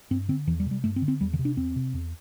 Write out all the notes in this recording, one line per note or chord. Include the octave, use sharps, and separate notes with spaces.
G2 C4
D3 C4
E2 E3
G3
C3
G3
G2 A3
C4
D3
C4
E2 G3
D3
C3
D4
E2 C4
C3
E2